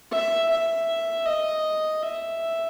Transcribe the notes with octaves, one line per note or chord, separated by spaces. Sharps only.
E5
E5
D#5
E5